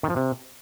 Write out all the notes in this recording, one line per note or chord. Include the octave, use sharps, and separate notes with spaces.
D#3
F3
C3